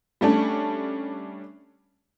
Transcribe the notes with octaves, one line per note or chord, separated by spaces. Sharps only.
G3 A3 C#4 D4